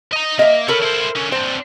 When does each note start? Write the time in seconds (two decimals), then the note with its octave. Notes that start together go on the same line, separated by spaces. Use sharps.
0.13 D#5 A#5
0.39 A#3 D#5 E5
0.68 A4 A#4 C#5 B5
0.83 E4 C5
1.16 D3 C#4
1.32 C4 D4 C5